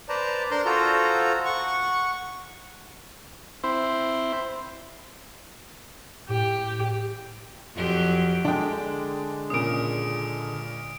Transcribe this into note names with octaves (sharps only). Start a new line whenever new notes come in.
B4 C5 D5 A5 A#5
D4 A#4 C5 A#5 C6 F6
F4 F#4 A4 C5 A#5
F#5 C#6
C4 E4 C5
A2 G4
F2 F#3 G4
D3 G#3 D4 G5
A#2 C#3 D#6 D7